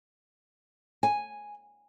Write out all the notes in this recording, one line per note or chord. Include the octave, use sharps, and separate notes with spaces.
G#5